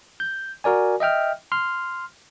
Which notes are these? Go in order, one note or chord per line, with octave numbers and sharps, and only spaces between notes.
G6
F#4 A#4 D5 G#5
D#5 E5 G5 F6
C6 F6